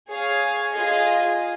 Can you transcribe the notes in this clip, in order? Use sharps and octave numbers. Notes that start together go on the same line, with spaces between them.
G#4 C#5 F5 G#5
F4 G#4 D#5